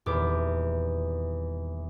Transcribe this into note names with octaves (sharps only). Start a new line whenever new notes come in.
D#1 E2 D6